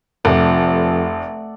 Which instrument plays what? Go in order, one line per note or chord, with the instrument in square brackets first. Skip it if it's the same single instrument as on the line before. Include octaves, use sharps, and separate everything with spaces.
[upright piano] F1 [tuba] F2 [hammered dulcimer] A3 D5 F#5